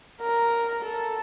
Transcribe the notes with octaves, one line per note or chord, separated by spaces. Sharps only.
A#4
A4